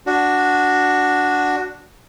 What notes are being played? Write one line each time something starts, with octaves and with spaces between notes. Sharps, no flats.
D4 F#4